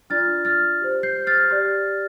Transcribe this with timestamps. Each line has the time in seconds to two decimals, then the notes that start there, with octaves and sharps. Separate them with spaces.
0.10 D4 F4 D5 F6 A6
0.45 F6 A6
0.81 G4 C5
1.03 G6 C7
1.27 F6 A6
1.51 G4 D5